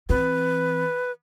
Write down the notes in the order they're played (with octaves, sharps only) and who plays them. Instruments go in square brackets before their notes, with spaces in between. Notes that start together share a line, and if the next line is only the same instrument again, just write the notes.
[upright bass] E3 C4 [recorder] B4